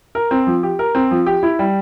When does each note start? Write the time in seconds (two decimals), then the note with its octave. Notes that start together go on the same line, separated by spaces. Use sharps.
0.15 A#4
0.31 C4
0.47 F3
0.63 G4
0.79 A#4
0.95 C4
1.11 F3
1.26 G4
1.43 E4
1.59 G3